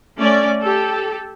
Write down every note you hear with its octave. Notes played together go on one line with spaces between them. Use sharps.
A3 C#4 D5
G4 A4